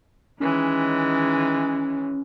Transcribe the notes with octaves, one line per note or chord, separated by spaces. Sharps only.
D#3 E3 G#3 C#4